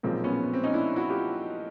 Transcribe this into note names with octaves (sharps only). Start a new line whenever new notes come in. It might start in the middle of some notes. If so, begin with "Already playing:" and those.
B1 A#2 F3 G#3 C4
B3 C#4
B3
C4
C#4 D#4
D4 E4
E4 F#4
F4 G4